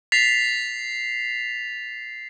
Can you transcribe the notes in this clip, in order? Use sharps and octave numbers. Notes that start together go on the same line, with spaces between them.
A6 B6 C7 F7